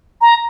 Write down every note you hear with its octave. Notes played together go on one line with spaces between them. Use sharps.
A#5